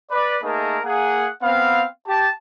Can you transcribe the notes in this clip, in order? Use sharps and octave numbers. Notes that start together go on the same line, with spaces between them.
B4 D5
A3 A#3 D#4 G#4 A#4 A5
A#3 G#4 F#5
B3 C4 F5
G4 A5